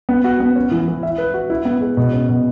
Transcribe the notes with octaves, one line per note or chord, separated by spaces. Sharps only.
B3
F#4
B3
C#4
E3
E3
E5
B4
F#4
E4
B3
G#3
B2
C#4
B2